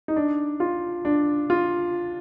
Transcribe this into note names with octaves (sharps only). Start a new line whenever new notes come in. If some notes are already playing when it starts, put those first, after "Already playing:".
D#4
D4
F4
D4
F4